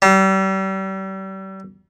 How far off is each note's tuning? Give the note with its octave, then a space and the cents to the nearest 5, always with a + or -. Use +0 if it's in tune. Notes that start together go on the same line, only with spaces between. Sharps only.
G3 -35